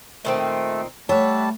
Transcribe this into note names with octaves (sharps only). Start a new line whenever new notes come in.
A#2 D#3 A3 C4
G3 A3 C#5 E5 F#5 A5